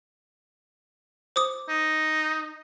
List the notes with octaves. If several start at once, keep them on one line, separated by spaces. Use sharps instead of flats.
C5 D6 D#6
D#4